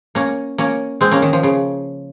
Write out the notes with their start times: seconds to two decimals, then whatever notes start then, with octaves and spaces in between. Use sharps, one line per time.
0.15 A#3 C#4
0.58 A#3 C#4
1.01 G#3 C4
1.11 A#3 C#4
1.22 D#3
1.33 F3
1.43 C#3